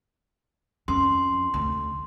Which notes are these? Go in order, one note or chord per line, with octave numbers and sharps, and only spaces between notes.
F2 C#4 C6
D2